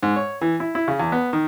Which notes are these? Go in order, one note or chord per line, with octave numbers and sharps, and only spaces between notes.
G#2
C#5
E3
E4
E4
C#3
E2
B3
D#3